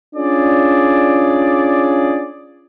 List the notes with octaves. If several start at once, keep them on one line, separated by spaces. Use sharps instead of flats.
C#4 D4 F4 G#4 D5